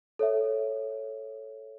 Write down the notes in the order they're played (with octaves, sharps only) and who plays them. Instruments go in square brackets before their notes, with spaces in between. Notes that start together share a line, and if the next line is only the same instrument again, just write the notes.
[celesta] A4 C#5 E5